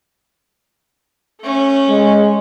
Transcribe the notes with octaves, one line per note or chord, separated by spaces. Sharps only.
A3 C#4
G#3